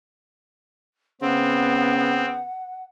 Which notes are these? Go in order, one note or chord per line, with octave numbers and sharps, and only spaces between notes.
C#3 B3 C4 F#5